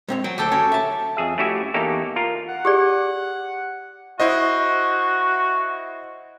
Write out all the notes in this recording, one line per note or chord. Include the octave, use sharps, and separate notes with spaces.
G#3 C4 C#5
F#3 G5
D2 G4 A4 G5
C#4 F#4 C#5
E5 A5
F2 G#4 E5
A3 C#4 E4 F#4 G4 E5
E2 A#3 D#4 G4 A4 C#5
F4 A#4
F#5
G4 G#4 D5
E4 F#4 C5 D#5